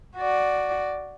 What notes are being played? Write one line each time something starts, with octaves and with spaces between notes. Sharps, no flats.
F#4 D5